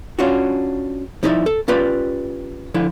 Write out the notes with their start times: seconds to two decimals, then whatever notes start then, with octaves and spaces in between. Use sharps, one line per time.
0.19 C#4 D4 F4 F#4
1.23 F3 D#4 E4 B4 D5 E5
1.46 A4
1.68 C#4 F4 G4 B4 D5
2.74 D3 F3 E4